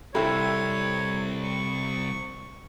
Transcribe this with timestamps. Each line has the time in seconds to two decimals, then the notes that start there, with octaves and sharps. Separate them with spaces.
0.15 C2 C3 E4 A4 C#5 B5
1.43 C#6